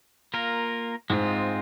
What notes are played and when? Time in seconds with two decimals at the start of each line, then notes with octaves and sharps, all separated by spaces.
0.34 A#3 F4 A#4
1.10 G#2 G#3 C4 F4